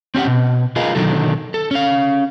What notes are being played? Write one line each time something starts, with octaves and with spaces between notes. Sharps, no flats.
C4 C#4 G4 F#5
B2
F4 G#4 A#4 B4 D#5 F5
B1 D3 D#3 F#3 A4
A4
C#4 F5